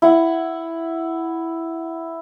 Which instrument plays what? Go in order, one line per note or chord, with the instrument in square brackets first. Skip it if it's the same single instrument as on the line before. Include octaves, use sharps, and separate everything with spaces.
[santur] E4 F#5